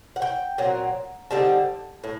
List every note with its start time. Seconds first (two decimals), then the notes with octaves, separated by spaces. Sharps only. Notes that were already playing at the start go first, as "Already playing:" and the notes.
0.16 F#5
0.22 G5
0.58 A#2 F#3 C4 A#5
1.31 D3 G3 C4 D#4 A5
2.04 A2